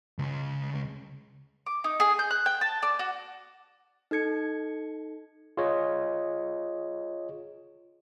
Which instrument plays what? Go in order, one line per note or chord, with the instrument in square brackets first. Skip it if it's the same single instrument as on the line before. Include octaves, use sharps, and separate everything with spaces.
[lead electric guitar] C#2 C#3
[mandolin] D6
D#4
G#4
G6
F#6
G5
A5
D5
F#4
[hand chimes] D#4 A4 G#6 C#7
[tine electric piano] F4 G#4 C#5 D#5